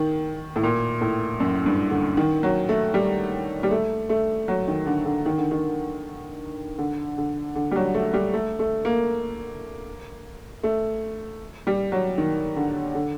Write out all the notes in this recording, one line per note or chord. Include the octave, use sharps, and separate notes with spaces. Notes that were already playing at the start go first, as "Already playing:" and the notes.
Already playing: D#3
A2
A#2
A2
F#2
G2
D3
D#3
F#3
A3
G3
G3
A3
A3
F#3
D#3
D3
D3
D#3
D3
D#3
D3
D3
D3
G3
F#3
A3
G3
A3
A3
A#3
A3
G3
F#3
D#3
D3
D3